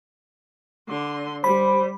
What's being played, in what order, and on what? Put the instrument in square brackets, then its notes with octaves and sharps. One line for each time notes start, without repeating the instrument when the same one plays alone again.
[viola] D3 C6
[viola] G3 [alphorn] C5 [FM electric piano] B5